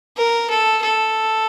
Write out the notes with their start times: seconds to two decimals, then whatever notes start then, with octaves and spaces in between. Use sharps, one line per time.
0.16 A#4
0.49 A4
0.83 A4